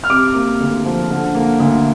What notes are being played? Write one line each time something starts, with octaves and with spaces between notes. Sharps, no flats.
F6
C3 D6
A#3
D2
F3
D3
A#3
D2